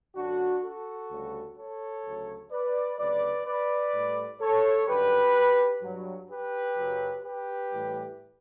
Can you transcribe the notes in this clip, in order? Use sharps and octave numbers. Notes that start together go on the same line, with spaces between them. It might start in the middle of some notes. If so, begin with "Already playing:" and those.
F#2 D3 F#3 D4 F#4
F#4 A4
D2 C#3 G3
A4 C#5
D2 C#3 F#3
B4 D5
D2 C#3 F#3 B4 D5
B4 D5
A2 G3
A4 C#5
F#2 D3 G3 G4 B4
G2 F#3
G4 B4
F#2 C#3 F#3
G4 B4
A2 E3 G3